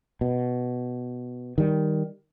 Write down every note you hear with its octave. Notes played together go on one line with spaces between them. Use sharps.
B2
D#3 G3